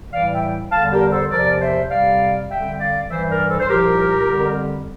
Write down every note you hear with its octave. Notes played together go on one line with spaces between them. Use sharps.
A2 E3 G3 D5 F5
E5 G5
E2 D3 G3 F5 A5
G4 A#4
A4 C5
E2 C3 F3 A#4 D5
C5 E5
F2 C3 G3 D5 F5
F2 D3 G3 E5 G5
D5 F5
G2 E3 G3 C5 E5
A#4 D5
A4 C5
C5
C2 A#2 F3 G4 A#4
F2 D3 G3